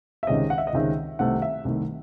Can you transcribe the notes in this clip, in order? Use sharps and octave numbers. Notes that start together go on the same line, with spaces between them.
E5
C#2 C3 D#3 G#3 C#4 D#5
F#5
E5
D#5
C#2 C3 D#3 G#3 C#4 E5
C2 C3 D#3 A3 F#5
E5
C2 C3 D#3 A3